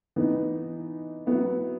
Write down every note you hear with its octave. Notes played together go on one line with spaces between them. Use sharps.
E3 B3 D#4
F#3 B3 E4